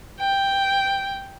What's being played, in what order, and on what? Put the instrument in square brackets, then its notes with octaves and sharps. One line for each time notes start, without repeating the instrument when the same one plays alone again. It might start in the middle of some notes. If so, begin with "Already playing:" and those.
[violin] G5